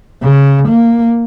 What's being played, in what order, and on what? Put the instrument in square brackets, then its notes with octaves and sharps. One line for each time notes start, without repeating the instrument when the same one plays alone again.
[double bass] C#3
A#3